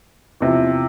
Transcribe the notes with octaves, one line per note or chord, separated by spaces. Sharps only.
E2 C3 F3